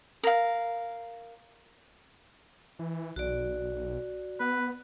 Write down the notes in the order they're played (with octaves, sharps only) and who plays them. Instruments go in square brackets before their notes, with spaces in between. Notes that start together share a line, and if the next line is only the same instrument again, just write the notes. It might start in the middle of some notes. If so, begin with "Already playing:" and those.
[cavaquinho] A#4 F5
[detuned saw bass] E3
[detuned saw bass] B1 [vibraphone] F#4 D5
[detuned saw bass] B3 [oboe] B4